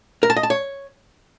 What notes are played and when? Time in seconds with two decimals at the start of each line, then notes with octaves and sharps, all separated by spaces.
0.23 A#4
0.30 A5
0.36 D#5
0.43 A5
0.50 C#5